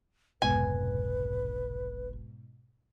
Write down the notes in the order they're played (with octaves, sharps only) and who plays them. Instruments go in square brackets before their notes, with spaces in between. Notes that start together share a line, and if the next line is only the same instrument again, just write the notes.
[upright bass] F1 B1 [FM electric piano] G#2 B2 [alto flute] B4 [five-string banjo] G#5